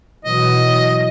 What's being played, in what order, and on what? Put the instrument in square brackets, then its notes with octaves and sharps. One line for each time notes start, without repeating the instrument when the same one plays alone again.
[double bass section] B2 E3 F#3 [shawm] D#5